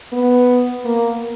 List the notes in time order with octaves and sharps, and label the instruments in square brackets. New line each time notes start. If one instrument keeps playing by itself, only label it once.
[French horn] B3
A#3